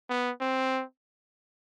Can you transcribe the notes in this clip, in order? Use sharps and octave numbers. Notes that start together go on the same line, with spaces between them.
B3
C4